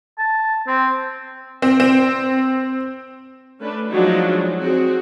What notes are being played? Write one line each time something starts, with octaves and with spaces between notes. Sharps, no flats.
A5
C4
C4
C4
A3 C#4 D4 B4
F3 F#3 G#3 D4 D#4
C4 F#4 G#4